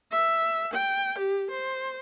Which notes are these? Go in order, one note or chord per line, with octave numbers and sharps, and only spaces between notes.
E5
G5
G4
C5